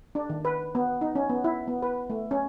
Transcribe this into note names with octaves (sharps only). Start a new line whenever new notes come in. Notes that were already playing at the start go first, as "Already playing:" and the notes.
D4
D#3
B4
B3
D#4
C#4
B3
E4
B3
B4
A3
C#4